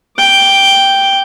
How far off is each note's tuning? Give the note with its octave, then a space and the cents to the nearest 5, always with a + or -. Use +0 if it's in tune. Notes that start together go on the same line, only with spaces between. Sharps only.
G5 +0 D6 +0